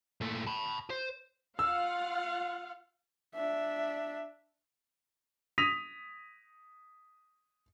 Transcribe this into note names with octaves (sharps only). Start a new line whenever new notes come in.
A#2 A3
A5 B5
C5
F4 F5 F#5 E6
D4 E5
D#6 A#6 B6 D#7 F7